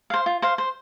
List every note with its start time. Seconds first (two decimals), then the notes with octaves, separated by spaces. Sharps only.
0.10 C5 F5
0.26 F4
0.42 C5 F5
0.58 C5